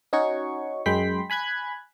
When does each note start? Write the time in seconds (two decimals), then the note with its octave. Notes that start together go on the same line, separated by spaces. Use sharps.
0.13 C#4 D#4 F#4 C#5 C#6
0.86 F#2 G#3 G5 B5 C6 B6
1.30 G#5 B5 F#6 G#6